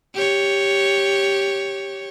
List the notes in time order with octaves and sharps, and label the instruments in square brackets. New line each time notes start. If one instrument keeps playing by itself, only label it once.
[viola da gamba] G4 C#5